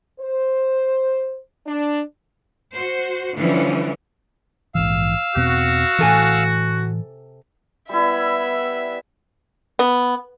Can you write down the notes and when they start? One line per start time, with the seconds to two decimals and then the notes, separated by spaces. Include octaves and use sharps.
0.20 C5
1.67 D4
2.71 F#4 C5
3.36 D3 E3 F3 G3 C#4
4.75 A#1 G#2 E3 F5 E6
5.36 E2 B2 C4 F#4
5.99 A2 C3 E3 A4 G#5
7.89 G3 B3 E4 E5
9.79 B3